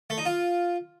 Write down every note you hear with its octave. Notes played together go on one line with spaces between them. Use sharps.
A3
D#4
F4